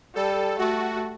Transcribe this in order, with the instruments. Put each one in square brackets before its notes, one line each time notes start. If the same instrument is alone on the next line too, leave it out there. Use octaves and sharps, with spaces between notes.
[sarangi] G3 [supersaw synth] A4
[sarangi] A3 [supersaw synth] F#4